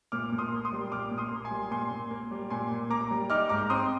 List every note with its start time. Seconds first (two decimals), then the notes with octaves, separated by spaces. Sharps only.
0.12 A#2 D6 F6
0.32 A#2
0.38 C6 D#6
0.52 A#3
0.65 C6 D#6
0.72 G3
0.92 A#2 D6 F6
1.11 A#2
1.18 C6 D#6
1.31 A#3
1.45 G#5 C6
1.51 G3
1.71 A#2 G#5 C6
1.91 A#2
2.11 A#3
2.31 G3
2.50 A#2 G#5 C6
2.71 A#2
2.90 A#3 A#5 D6
3.11 G3
3.30 D#4 D6 F6
3.49 G#2 A#5 D6
3.70 C4 C6 D#6